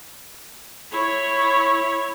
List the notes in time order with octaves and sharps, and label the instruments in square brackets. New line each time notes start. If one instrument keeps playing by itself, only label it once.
[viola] E4 C#5